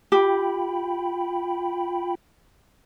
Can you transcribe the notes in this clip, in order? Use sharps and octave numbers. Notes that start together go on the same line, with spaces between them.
F4 G4 G5 B5